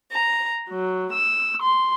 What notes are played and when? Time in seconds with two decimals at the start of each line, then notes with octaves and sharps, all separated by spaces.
0.11 A#5
0.67 F#3
1.12 E6
1.62 C6